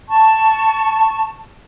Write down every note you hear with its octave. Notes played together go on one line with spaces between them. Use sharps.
A5 C#6